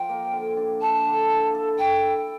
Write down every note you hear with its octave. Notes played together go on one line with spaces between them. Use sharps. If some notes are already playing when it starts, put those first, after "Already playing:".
Already playing: F3 G5
A#3
D3
D4
D4 A5
D3
E4
A4
A4 G5
E4